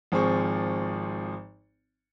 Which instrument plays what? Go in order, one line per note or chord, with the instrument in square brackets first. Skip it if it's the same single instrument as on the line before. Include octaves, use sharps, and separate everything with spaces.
[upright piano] G#1 F3 C4 G#4 C#6